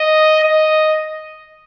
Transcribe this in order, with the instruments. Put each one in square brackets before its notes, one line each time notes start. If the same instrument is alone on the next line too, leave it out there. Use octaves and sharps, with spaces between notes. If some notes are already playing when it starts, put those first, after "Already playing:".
Already playing: [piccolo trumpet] D#5
D#5